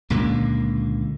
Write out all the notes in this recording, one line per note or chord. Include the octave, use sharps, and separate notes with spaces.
C#2 A#2 D3 A#3